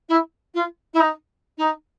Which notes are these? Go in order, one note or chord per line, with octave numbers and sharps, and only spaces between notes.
E4
F4
E4
D#4
D#4